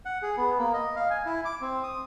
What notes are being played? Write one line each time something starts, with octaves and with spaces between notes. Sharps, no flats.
F#5
G#4
B3
A#3
D#5
F5
G#5
E4
D6
C4
D#6